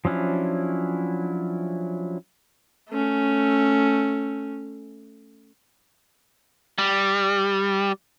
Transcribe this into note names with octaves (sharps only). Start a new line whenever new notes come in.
F3 F#3 C#4 D4 E4
A3 C#4
G3